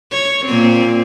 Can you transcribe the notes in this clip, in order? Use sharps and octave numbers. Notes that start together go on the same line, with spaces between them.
C#5
A#2 A#3 C4